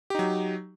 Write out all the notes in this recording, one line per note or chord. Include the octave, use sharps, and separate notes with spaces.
F#3 D#4 G4